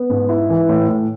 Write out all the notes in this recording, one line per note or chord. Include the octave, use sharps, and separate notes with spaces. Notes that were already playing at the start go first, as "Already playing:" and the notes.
Already playing: B3
G#2
E4
E3
A2
A2